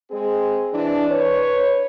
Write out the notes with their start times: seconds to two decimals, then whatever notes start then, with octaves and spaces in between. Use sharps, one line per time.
0.11 G#3 C4 G#4
0.73 E3 D4
1.10 B4 C#5